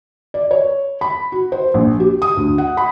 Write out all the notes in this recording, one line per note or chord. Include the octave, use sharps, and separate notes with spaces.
D5
C#5
B5
F#4
C5
A#1
G4
D#6
D2
F#5
B5